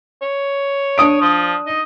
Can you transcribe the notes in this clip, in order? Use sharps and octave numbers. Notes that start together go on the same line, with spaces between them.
C#5
D4 D#6 D7
F3
D#4